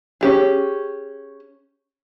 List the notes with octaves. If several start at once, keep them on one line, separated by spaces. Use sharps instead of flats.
C#4 G4 G#4